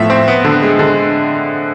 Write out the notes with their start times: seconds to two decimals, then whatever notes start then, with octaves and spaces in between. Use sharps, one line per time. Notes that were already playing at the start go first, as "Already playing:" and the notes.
Already playing: A2 F3 A3 B3 E5
0.10 C4
0.28 B3
0.44 D3
0.62 G#3
0.79 D3